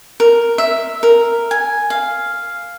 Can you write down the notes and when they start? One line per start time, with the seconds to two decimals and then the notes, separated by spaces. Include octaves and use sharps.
0.20 A#4
0.58 E5
1.03 A#4
1.51 G#5
1.90 F5